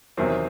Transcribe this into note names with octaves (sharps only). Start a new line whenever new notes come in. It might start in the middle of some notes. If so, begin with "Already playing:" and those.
E2 C3 D#3 F#3 C4